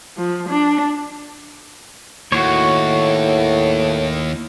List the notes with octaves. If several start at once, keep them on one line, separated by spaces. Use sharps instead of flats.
F3
D4
D#2 A2 F#4 C#5